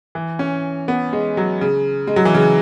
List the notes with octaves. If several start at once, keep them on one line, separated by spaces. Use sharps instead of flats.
E3
C#4
B3
G#3
F#3
C#3
G#3
F#3
E3
C#3